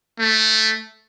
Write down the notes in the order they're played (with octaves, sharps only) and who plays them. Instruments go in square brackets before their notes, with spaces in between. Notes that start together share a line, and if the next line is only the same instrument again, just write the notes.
[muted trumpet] A3